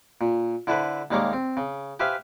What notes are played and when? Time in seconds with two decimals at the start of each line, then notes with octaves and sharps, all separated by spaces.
0.21 A#2
0.67 D3 E4 A4 B4 C5
1.11 D#2 G3 G#3 A#3 C#5 D6
1.33 C4
1.57 C#3
2.00 G4 B4 C5 E5 F5 G#5